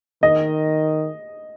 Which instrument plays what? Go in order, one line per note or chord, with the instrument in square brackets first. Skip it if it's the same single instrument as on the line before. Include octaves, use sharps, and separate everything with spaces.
[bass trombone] D#3 [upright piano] D#5